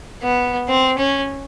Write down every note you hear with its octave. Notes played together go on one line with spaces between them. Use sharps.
B3
C4
C#4